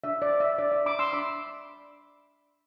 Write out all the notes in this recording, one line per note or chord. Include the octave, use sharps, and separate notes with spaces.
D4 E5
D5
C5
E5
D4 D5
E5
D4 B5 D6
C6 E6
D4 B5 D6